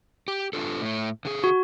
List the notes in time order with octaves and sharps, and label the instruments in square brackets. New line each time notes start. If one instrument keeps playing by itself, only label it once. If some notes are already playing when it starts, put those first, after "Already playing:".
[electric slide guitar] G4
D4 F4 A4
A2 A3
D3 G#4
[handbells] F#4